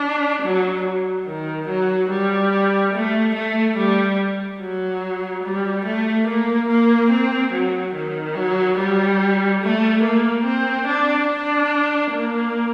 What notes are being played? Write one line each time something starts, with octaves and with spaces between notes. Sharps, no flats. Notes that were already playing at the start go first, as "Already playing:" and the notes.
Already playing: D4
F#3
D#3
F#3
G3
A3
A3
G3
F#3
G3
A3
A#3
A#3
C4
F#3
D#3
F#3
G3
A3
A#3
C4
D4
D4
A#3